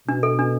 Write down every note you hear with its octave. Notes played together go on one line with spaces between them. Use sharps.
B2 D4
A4
D4